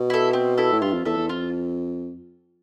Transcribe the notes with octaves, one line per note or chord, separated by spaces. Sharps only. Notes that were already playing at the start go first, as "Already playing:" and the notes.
Already playing: B2
E4 A4
C4
E4 A4
A2
G2 F4
F2
E2 A4 E5
E2
F2 F4